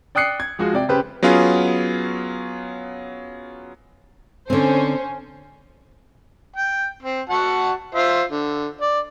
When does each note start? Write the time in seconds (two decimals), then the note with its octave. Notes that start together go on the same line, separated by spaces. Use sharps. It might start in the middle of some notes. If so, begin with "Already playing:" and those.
0.15 D5 G5 D#6 F#6 C7 C#7
0.40 G#6
0.59 F3 G#3 F4 F#4
0.73 C3 D5 G5
0.89 C#3 G4 B4 C5
1.23 F#3 B3 C#4 F4 G#4
4.50 D3 C4 C#4 C5
6.56 G5
7.02 C4
7.30 F#4 F#5 A5
7.95 F4 C5 E5
8.29 D3
8.81 D5